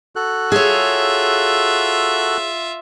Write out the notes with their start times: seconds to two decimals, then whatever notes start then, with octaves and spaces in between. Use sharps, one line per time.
0.16 F#4 A4 F#6
0.52 F4 G#4 C#5 E5